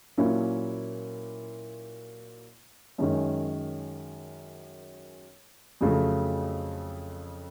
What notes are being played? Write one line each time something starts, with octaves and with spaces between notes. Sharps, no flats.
A#2 F#3 A#3 C#4 E4
F#2 D#3 G#3 C#4
F2 C#3 F#3 A3